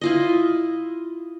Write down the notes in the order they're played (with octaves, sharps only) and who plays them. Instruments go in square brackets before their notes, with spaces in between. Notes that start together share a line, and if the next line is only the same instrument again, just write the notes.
[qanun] E4 F4 D#5